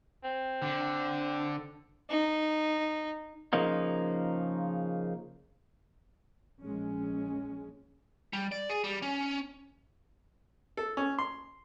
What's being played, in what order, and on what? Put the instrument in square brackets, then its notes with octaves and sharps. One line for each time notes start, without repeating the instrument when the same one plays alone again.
[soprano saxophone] C4
[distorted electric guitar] D3
[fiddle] D#4
[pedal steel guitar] C#3 F3 A#3 D#4
[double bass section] A#1 G#3 C#4
[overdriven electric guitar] G3
D5
G#4
G3
C#4
[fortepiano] A4
C#4
C6